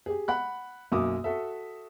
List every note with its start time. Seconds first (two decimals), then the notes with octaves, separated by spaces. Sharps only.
0.06 G4 G#4
0.28 F#5 B5 F#6
0.92 B1 F#2 A#3 D6 D#6
1.24 F#4 A4 E5